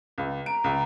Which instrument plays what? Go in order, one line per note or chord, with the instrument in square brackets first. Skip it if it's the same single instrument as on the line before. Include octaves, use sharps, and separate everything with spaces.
[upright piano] C#2
[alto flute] A#5 [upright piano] D7
[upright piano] C#2